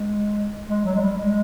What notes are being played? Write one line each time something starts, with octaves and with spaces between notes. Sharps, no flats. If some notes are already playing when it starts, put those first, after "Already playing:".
Already playing: G#3
G#3
F#3
G#3
G3
G#3